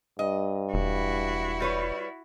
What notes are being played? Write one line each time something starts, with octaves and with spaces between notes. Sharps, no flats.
G2 D#5
E1 E4 F#4
G3 B4 C#5